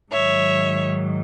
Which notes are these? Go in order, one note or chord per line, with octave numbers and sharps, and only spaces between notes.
G#2 D#3 F#3 C#5 E5